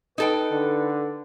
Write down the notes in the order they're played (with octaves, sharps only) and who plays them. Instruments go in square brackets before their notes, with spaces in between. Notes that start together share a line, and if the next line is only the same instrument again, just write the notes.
[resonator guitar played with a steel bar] D#4 A4 G5 [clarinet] B4
[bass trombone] D3